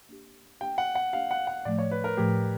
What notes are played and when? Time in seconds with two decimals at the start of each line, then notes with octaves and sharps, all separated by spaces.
0.09 A#3 D4 G4
0.61 A#3 D4 G4 G5
0.78 F#5
0.95 F#5
1.13 A#3 D4 G4 F5
1.31 F#5
1.47 F#5
1.65 A2 F3 A3 D5
1.79 C#5
1.91 B4
2.04 A#4
2.17 A2 F3 A3 G4